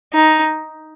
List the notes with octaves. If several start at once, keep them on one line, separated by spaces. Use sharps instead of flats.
D#4